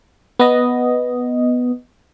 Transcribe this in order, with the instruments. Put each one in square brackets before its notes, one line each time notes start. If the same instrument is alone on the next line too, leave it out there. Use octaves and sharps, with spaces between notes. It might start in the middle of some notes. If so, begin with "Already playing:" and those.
[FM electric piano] B3 D#5